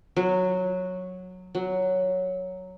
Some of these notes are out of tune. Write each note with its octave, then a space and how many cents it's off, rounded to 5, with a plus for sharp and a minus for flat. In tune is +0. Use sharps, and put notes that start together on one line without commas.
F#3 -10
F#3 +0